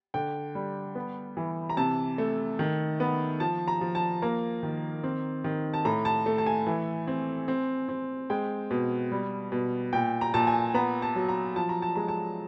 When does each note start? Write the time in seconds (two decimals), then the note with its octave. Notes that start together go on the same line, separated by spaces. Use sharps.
0.14 D3 G5
0.55 G3
0.95 B3
1.37 E3
1.70 A#5
1.77 C3 A5
2.18 A3
2.59 D#3
3.00 B3
3.40 F3 A5
3.68 A#5
3.81 F3
3.95 A5
4.22 A#3 A#5
4.63 D#3
5.04 C4
5.44 D#3
5.74 A5
5.85 A2 A#5
6.05 A5
6.26 A3
6.38 A5
6.46 G#5
6.67 E3
7.07 C4
7.48 C4
7.89 C4
8.30 G#3 G5
8.71 B2
9.12 G3
9.52 B2
9.93 A#2 G5
10.21 A#5
10.34 A#2 A5
10.47 G#5
10.74 B3 A#5
11.02 A5
11.16 F#3
11.29 A#5
11.56 F3 A5
11.69 A#5
11.82 A5
11.95 G#3 A#5
12.08 A5